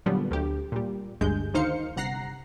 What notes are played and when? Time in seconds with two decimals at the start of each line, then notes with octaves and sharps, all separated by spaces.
0.06 A#2 D3 F#3 G3 B3
0.31 D2 G4
0.72 A#2 G3
1.21 G1 D2 G2 G#3 G6
1.54 D2 D#3 D#4 C5 F5 C#7
1.96 G1 C3 F#5 A#5 A#6 C7